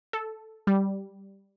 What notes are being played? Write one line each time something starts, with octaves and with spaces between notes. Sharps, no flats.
A4
G3